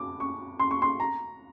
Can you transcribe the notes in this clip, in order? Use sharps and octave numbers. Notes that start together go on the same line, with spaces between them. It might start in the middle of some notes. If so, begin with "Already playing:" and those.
Already playing: D6
C#6
C6
C#6
C6
A#5